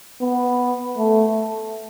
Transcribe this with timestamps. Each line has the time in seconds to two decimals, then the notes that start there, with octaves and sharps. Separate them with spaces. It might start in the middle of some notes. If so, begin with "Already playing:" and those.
0.21 B3
0.97 A3